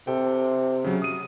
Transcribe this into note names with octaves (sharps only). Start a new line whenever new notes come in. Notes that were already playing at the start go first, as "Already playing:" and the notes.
C3 A4 G5
C#3 F#3
D#6 D#7